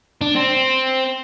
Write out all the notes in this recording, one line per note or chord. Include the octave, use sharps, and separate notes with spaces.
D4
C4